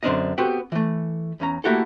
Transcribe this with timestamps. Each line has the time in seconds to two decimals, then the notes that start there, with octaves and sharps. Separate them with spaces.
0.03 F#2 D3 C4 D4 A#4 D#5
0.38 B3 C4 F#4 G4 A4 B4
0.72 E3 A3
1.40 E2 C#4 A#5
1.64 A3 A#3 E4 F#4 G4 A4